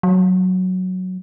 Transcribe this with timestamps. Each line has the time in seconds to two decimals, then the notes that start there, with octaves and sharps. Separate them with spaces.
0.03 F#3